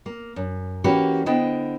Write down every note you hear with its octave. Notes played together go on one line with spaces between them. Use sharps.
A#3
F#2
E3 A#3 C#4 F#4 G4 B4
D3 B3 E4 C5 D#5 G5